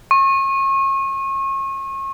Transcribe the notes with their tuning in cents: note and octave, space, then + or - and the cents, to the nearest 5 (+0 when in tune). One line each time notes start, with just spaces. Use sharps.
C#6 -35